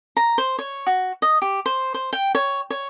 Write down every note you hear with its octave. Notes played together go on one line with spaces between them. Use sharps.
A#5
C5
C#5
F#4
D#5
G4
C5
C5
G5
C#5
C#5